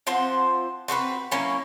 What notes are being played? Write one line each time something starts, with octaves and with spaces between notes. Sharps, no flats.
F3 C4 C5 F#5
C4 F#4 A4 B4
F#3 A#3 C#4 E4